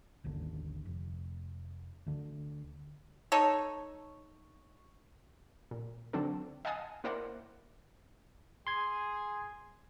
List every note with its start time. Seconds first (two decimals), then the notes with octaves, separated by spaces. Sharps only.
0.24 D#1 G#1 D#2 D3
0.85 F1
2.07 D2 D3
3.32 D#4 A4 C#5
5.71 A#2
6.13 D3 F#3 C4 D4 A4
6.65 D#5 F5 F#5 G#5 A5 D#6
7.04 A#3 E4 A#4 C5 D5 F#5
8.67 G#4 G#5 C6 G#6